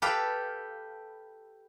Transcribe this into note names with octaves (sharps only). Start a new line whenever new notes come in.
G4 A4 B4 F5 G5